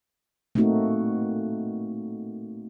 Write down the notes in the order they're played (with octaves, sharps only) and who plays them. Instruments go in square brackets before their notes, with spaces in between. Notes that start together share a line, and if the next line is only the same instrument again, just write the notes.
[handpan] A3 A#3 C4 D#4 F#4